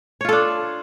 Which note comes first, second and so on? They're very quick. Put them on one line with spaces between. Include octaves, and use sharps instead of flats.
C#5 F4 A4 D4